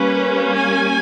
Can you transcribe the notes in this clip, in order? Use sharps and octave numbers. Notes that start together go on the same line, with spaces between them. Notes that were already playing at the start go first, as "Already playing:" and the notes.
Already playing: G3 A#3 C#4 B4
G#5